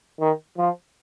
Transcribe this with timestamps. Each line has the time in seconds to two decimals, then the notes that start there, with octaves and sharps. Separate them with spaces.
0.20 D#3
0.57 F3